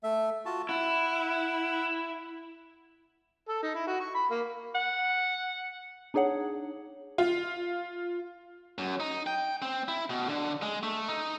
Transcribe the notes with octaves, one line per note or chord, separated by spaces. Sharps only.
A3 E5
F4 F#4 A5
E4 F#5
A4
D#4
E4
F#4
C#6
B5
A#3
F#5
D4 D#4 G#4 C#5 F#5
F4
F#2
D#4
G5
C4
E4
B2
D3
G#3
A3
D#4